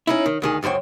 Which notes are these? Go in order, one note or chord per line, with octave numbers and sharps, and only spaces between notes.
C#4 D#4 E4
D#3
D2 D#3 G#4
C#2 F#2 C5 C#5 G5